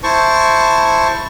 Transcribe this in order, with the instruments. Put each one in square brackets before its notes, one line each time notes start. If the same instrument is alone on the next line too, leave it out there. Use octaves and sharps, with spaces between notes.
[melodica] E4 C5 A5 C#6